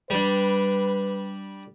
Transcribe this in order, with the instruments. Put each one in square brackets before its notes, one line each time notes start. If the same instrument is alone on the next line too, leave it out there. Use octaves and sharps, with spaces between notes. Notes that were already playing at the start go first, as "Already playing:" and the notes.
[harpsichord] G3 D4 [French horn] B4